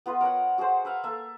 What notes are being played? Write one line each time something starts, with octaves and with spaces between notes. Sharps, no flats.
B3 F4 B4 D#5
A#4 C#5 D#5 F#5
F#4 G#4 A#4 C5
B4 E5 F5
A#3 A4 E5